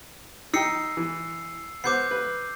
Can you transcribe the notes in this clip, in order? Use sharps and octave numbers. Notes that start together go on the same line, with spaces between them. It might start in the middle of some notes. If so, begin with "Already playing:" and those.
D#4 G5 E6 C7 C#7
E3
B3 C5 D6 G6 C7
B4